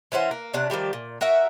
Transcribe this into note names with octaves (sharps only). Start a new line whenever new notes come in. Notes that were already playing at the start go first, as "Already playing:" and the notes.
E3 C#4 C5 F#5
A#3
C3 C#4 D4 F#5
D#3 F3 G3 G4
A#2
F#4 A#4 E5 F#5